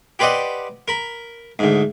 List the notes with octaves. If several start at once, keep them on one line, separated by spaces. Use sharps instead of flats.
G4 B4 C5 D5 D#5 F#5
A#4 B5
D2 G#2